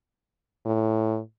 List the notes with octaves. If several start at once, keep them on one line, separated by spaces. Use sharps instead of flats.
A2